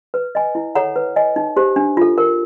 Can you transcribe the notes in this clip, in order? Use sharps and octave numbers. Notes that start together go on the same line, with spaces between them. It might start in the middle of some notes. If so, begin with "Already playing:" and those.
B4
D#5 G#5
E4
A4 C#5 F#5 A#5
B4
D#5 G#5
D#4
G4 C5
D4
F4 A4
A#4